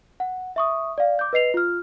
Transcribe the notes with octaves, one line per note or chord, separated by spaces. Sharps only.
F#5
E5 C#6 D#6
D5 F5
D6 G6
B4 D#5 C7 F7
F4 F6